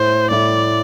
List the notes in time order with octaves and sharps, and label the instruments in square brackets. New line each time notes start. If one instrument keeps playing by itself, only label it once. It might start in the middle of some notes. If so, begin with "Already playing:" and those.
Already playing: [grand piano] A2 A3 E4 [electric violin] C5
[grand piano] A2 A3 E4 [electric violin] D5